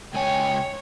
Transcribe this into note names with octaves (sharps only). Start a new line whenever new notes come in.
C#2 C#5 G5 G#5